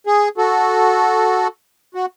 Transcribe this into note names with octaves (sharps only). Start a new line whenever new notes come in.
G#4
F#4 A4
F#4